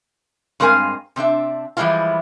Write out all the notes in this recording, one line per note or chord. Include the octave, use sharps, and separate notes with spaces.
G2 G#3 C4 A#4 F5 G#5
C3 C4 D4 E5
E3 F3 G3 G#3 E4 F4